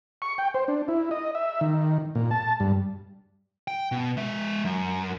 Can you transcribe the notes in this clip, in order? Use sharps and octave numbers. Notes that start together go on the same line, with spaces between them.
C#6
G5
C5
D4
E4
D#5
E5
D#3
A#2
A5
G2
G5
B2
G#3 E5
F#2